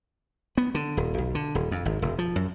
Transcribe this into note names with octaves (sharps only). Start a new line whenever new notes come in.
B3
D3
D#1
B1
D3
D#1
F2
G#1
E1
F3
F#2